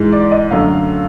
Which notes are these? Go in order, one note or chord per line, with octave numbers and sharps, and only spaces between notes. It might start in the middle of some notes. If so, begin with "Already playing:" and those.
Already playing: G#2 E3 G#3
D5
D#5
F#2 D3 F#3 A3 F5